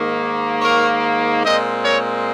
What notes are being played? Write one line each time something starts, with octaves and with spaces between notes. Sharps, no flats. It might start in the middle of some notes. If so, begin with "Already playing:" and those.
Already playing: G#2 D#3 A#3
A#4 C#5
A#2 G#3 C4 C5 D#5
A#4 C#5